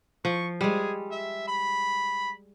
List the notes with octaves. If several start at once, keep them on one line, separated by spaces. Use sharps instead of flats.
F3 C#6
G3 G#3 G#4
E5
B5